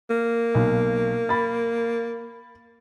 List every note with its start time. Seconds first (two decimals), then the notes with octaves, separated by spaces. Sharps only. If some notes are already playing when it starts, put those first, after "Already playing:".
0.10 A#3
0.55 B1
1.29 B5 A6